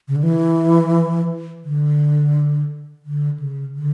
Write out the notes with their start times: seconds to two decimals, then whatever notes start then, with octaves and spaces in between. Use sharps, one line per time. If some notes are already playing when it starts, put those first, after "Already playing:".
0.08 C#3
0.16 D3
0.23 E3
1.64 D3
3.05 D3
3.40 C#3
3.75 D3